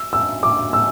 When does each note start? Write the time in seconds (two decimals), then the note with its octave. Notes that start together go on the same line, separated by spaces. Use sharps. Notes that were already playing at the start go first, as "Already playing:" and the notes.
Already playing: E6
0.13 E6
0.43 D6
0.73 E6